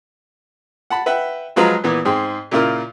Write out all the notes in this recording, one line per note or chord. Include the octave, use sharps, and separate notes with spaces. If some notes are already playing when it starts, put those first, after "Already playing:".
F#5 A5 B5
B4 E5 F#5 G5
F3 F#3 G#3 F4 B4 A#5
A#2 E3 B3
G#2 C4 G#4 G5
A#2 C#3 E4 F4 A#4